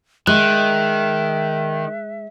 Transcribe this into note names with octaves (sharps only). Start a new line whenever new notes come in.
D#3 G#3 E5 F#6